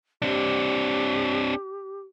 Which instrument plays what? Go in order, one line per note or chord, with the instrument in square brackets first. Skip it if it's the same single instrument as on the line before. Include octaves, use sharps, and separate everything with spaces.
[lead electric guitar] C4 D4 [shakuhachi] G4